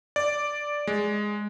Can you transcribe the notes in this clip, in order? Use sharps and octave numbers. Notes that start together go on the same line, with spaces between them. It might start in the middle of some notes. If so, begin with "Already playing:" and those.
D5
G#3